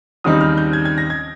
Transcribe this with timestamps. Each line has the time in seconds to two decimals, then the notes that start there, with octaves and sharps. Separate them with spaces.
0.24 D#2 C#3 G3 C4 D#4 D#6
0.41 F6
0.57 G6
0.73 G#6
0.85 G#6
0.98 A#6
1.10 G#6